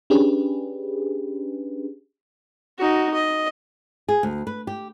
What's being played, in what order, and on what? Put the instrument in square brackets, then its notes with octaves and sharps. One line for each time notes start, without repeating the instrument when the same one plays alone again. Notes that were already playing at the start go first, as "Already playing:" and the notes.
[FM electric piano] C#4 D4 G4 G#4 B4
[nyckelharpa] D#4 F#4
D#5
[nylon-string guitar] G#4
D2
B4
G4